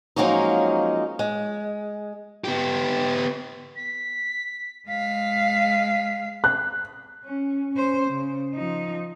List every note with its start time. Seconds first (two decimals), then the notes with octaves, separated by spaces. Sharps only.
0.16 F3 F#3 G#3 A#3 C#4 D#4
1.19 G#3
2.44 B3 G4
3.76 B6
4.88 G#3 F5 B6
6.44 F#6
7.25 C#4
7.72 C#4 C5
8.10 C#3
8.55 F3 D#4